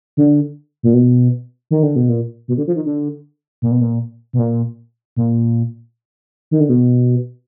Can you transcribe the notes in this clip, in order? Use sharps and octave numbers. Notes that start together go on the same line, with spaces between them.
D3
A#2
B2
D#3
D3
B2
A#2
B2
D3
F3
D#3
D3
A#2
B2
A#2
B2
A#2
A#2
D#3
D3
B2